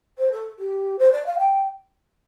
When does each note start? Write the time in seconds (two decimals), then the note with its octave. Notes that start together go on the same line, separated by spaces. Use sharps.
0.18 C5
0.32 A4
0.59 G4
0.99 C5
1.12 D5
1.26 F5
1.39 G5